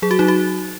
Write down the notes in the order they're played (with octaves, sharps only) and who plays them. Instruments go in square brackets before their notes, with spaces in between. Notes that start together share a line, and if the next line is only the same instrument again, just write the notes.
[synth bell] F#3 G#4
F#4
F#3 D#4
F#4